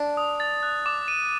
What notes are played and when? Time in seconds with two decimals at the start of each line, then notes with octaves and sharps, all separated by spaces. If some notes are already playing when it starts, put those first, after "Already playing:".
Already playing: D4
0.17 D#6
0.40 A6
0.63 F#6
0.86 D6
1.08 D#7